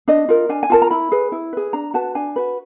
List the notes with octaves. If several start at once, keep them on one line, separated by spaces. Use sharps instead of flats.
D4 D#5
F4 A#4
D4 G#5
G#5
F4 A#4 A5
A#5
E4 B5
G#4 B4
E4
G#4 B4
D4 A#5
F#4 B4 A5
D4 G#5
F#4 B4